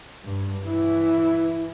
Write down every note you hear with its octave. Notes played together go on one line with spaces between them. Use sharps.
G2
E3 E4